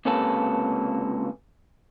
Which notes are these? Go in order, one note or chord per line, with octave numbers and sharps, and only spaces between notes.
C#2 C3 A#3 C#4 A4 B4